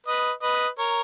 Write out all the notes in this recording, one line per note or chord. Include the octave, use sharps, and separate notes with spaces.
B4 D#5
B4 D#5
A#4 C#5